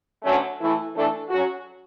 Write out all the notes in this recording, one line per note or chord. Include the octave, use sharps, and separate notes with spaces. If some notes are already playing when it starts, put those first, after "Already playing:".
D2 D3 F#3 A3 C#4
E3 A3 E4 A4
E3 A3 D4 A4
F#3 C#4 F#4